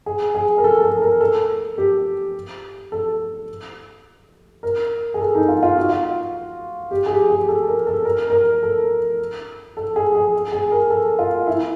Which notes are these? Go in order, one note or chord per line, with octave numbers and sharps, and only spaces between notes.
G#4
G#4
A#4
A4
A4
A#4
A4
G4
A4
A#4
G#4
A4
D#4
F4
F4
F#4
F4
G4
G#4
G4
G#4
A4
A#4
A4
A#4
A#4
A4
A4
G#4
G#4
G#4
A#4
A4
F4
E4